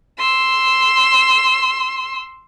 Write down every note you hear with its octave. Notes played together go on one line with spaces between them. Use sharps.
C6 E6